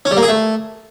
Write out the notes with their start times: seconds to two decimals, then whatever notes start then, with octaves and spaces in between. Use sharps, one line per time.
0.05 C#4
0.11 G3
0.17 A#3
0.23 G#4
0.28 A3